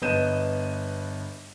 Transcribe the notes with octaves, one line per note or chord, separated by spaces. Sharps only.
G1 B3 D#5 G6 D#7 E7